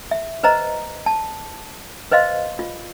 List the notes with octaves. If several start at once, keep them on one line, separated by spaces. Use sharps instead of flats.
E5
B4 C5 D#5 A#5
A5
B4 C5 D#5 F5 C6
F4